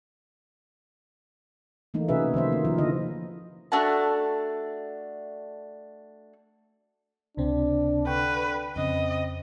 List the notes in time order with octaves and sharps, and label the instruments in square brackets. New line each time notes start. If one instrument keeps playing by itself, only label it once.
[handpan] E3 A3 A#3 D#4
C3 C#4 F#4 G#4 B4 E5
D#3 F3 C5 E5
A#3
F3 F4 A#4
D3 E4 D#5
[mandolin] A3 D4 F#4 A5
[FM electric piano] C#2 C3 C4 [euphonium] D4
[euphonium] D3 [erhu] B4 [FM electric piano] G5 C#6
[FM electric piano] F2 C#3 [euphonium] C4 [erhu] D#5